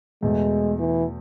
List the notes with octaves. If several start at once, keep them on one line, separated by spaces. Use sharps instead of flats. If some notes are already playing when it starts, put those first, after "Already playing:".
E2 B2 G#3 A3
E3